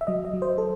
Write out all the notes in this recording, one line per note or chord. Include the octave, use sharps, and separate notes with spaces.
E5
F#3 D#5
D#5
F#3
C5
A4